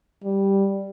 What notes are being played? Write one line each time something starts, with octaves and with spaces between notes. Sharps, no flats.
G3